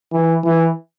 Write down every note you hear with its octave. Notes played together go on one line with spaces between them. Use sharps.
E3
E3